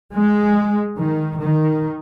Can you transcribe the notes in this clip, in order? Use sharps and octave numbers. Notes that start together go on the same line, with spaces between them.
G#3
D#3
D#3